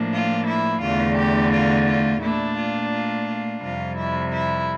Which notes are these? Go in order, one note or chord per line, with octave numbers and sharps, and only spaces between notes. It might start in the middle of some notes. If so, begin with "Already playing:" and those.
Already playing: A2 F3 A#3 D4
F4
E4
E2 D3 A3 F4
G4
F4
F4
A#2 A3 D4 E4
F4
F4
F4
F2 C3 G3 F4
E4
E4